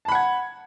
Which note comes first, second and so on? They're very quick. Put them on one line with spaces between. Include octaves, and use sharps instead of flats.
A5 B5 F#5 G#6